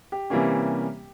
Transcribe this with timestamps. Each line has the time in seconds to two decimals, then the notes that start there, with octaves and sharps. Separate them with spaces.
0.12 G4
0.30 C3 E3 G3 A#3 C#4